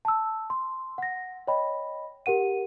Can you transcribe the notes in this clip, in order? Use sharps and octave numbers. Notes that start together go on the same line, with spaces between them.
A5 E6
C6
F#5 A#6
C#5 D#5 G5 B5
G4 A#4 F#5 D#7